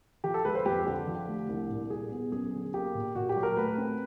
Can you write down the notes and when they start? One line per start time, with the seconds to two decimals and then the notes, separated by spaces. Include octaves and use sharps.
0.24 F3 G4
0.34 A4
0.44 G#3 B4
0.55 C5
0.66 F2 G4
0.86 D3 G4
1.07 F3
1.28 A3
1.49 C2
1.70 A#2
1.90 G3 G#4
2.11 B3
2.32 F#2 G#4
2.53 D3
2.74 A#3 G4
2.95 A#2
3.15 A#2 F#4
3.29 G4
3.36 F#3
3.43 A#4
3.57 A3 B4
3.78 C4